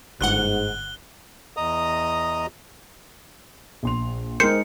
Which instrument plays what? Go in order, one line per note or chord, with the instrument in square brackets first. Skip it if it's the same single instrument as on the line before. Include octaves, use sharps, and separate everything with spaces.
[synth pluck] G1 F#5 [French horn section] G#2 [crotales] F#6 G7
[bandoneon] E2 D#5 A#5 D#6
[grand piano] A#1 C6 F7
[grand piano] G#3 D#4 [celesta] A#4 G5 F6 [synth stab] C5 [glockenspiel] C#7